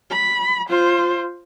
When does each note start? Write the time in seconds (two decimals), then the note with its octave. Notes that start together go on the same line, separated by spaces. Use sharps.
0.10 B5
0.69 F4 C5